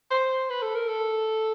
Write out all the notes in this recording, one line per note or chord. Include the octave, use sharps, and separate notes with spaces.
C5
B4
A4
A#4
A4